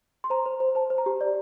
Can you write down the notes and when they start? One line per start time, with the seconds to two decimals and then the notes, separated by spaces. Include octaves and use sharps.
0.24 C6
0.30 C5 A#5
0.46 C5
0.60 C5
0.75 C5 A5
0.90 C5
0.98 A#5
1.06 G4
1.21 D5